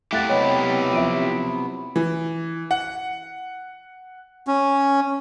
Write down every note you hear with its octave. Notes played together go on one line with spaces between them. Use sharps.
A3 E4 G4 F5 F#5 F#6 A6
C3 F#3 B3 C#5 D#5 G5
F3 E5 D7 D#7
E3
F#5
C#4